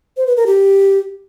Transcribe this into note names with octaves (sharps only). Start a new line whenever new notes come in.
C5
B4
A#4
G4